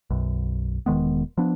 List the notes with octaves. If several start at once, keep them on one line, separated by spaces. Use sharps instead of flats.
B1 F#2
E1 D#3 G#3 B3
F3 B3 D4